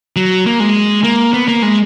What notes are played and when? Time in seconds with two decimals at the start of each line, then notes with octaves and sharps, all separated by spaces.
0.16 F#3
0.46 A#3
0.60 G#3
1.04 A#3
1.33 B3
1.48 A#3
1.62 G#3